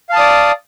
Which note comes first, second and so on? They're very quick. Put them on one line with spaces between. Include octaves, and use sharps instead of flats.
F5 A5 D#6 D5